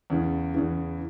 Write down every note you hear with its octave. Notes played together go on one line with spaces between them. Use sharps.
E2 C#3 E3
E2 C#3 E3